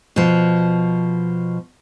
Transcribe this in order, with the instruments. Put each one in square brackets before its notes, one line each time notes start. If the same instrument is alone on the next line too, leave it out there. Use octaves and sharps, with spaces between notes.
[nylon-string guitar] B2 F3